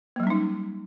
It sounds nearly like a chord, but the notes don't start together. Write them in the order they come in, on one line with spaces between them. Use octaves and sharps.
A#3 F#3 G3 C#4 D#4